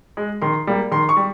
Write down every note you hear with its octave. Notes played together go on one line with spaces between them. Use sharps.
G#3
D#3 C6
G3 A#3
D#3 C6
C#6
G3